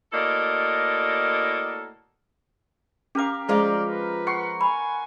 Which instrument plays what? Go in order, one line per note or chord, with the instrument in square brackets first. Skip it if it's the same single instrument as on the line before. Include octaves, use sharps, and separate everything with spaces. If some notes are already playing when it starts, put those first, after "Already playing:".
[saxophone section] A2 A#3 F#4 A4 D5 D#5
[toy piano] C#4 D6 [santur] G4 A#4 F5
[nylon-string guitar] F3 G#3 F4 [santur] A#4 A#5 [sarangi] D5
[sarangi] B4
[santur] F#5 C6 C#6
[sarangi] G#5 [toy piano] B5